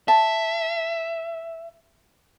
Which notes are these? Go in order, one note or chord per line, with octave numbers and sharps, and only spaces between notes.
E5 A5